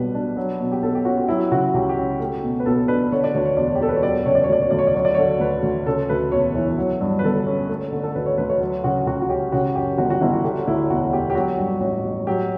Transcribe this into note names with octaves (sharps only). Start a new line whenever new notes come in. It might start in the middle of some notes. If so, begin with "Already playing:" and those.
Already playing: B1 B2 G3 B4
D4
F#3
B2
G4
B1 A4
G4
C#4 F#4
F#4
F#3 E4
C#3 F#4
C#2 G4
G4
C#4
A3
B2
B4
B1 A4
D4 B4
D3 C#5
D5
D2 C#5
C#5
E1 D5
G4
E1 A4
B4
C#5
F#3 D5
C#3 C#5
D5
C#5
D2 D5
C#5
D2 D5
C#5
D5
F#3 C#5
D5
D3 C#5
D2 B4
D2
C#3 A4
D2 B4
E1 C#5
E3
F#3
G2
B4
G1 A4
C#4
A3
D3
A4
D2 B4
C#5
D2 B4
C#5
F#3
C#3 F#4
C#2 F#4
F#4
C#4 G4
C#3 F#4
F#2 G4
G1 F#4
F#4
G1 E4
F#4
D3 G4
D2 E4
E1 F#4
E1 G4
G4
F#3 F#4
G2
A1
A1
F#3 G4